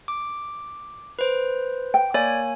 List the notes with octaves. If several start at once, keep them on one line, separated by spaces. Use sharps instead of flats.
D6
B4 C5
G5
A#3 C#5 D5 G#5